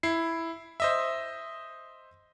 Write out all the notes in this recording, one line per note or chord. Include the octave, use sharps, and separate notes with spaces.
E4 C7
C5 D#5 E5